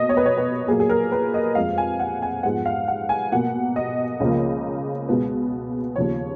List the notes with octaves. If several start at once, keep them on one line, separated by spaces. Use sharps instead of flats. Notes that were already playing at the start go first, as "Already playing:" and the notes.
Already playing: B2 A#3 D#5
C#5
B4
C#5
B4
A#2 F#3 A#3 G#4
G#4
A#4
B4
D#5
F2 F3 G#3 F5
G#5
F#5
G#5
G#2 F3 G#3 B3 F#5
F5
F#5
G#5
B2 A#3 F#5
D#5
C#2 C#3 F3 A#3
B2 G#3 B3
D#2 C#3 F3 C#5